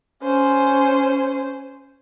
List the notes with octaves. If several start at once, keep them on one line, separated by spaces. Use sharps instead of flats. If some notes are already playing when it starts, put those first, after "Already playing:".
C#4 C5